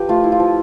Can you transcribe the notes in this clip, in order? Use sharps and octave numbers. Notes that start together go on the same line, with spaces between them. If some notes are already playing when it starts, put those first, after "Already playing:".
Already playing: F3 G4 B4
A3 F4
E4
F4
F3